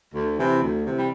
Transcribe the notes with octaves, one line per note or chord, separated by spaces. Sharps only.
D2
C3 E3
D2
C3 E3
G3